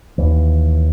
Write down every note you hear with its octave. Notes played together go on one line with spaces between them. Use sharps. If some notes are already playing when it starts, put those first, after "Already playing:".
D#2 E3